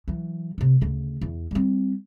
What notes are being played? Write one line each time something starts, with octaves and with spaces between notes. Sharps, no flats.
E3 F#3
C3 F#3
D2 C#3
E2
G3 C4